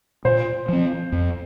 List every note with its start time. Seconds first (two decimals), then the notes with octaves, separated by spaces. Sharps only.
0.25 A#2 C5
0.69 F3 C4
1.12 F2